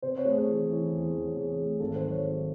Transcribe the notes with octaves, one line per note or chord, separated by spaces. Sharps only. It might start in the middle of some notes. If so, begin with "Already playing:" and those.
C3 C5
C#5
A3
G#4
E3
E3
E2
E2
C3 G#4
A3
G#1 A4
C5
F#3
C#5
D#3